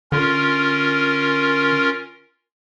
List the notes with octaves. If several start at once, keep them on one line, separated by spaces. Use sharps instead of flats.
D3 C#4 F4 A#4